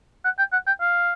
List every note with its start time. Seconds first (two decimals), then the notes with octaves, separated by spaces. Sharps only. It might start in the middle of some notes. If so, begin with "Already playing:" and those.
0.25 F#5
0.39 G5
0.53 F#5
0.67 G5
0.81 F5